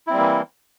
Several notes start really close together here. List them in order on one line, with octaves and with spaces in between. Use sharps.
E4 C4 G3 A#3 E3